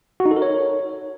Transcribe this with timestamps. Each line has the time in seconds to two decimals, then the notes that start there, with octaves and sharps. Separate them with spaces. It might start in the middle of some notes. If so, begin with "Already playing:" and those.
0.20 F#4
0.26 D#4
0.31 A4
0.36 A#4
0.42 C#5